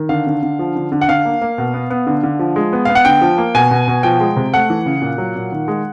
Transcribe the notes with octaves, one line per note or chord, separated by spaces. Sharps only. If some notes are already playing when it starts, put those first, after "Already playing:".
Already playing: D#3
D3 F5
D3
D3
F3
D3
D3
F#5
D3 F5
A#3
A#3
B2
B3
B3
D3
D3
F3
G#3
B3
B3 F5
F#5
D3 G5
F3
A#3
B2 G#5
B2
B2
F3 G5
G#3
C3
A3 F#5
E3
C#3
A#2
F#3
A#2
D#3
G#3